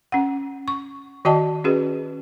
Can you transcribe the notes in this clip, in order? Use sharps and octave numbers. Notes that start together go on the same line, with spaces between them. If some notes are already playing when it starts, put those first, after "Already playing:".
C#4 F#5
C#6
D#3 F#4 D5 D#5 G5 A5
C#4 F#4 G#4 B4